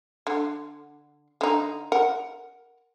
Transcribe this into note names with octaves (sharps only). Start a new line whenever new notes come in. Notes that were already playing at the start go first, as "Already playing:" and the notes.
D3
D3 D#4
A#4 F#5